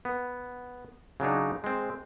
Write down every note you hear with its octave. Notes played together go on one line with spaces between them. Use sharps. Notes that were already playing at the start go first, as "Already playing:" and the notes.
B3
C#3 F#3 D4 D#4
G#3 C4